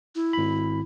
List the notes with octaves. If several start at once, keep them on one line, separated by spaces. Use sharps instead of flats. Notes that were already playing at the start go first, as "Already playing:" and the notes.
E4
G#1 B5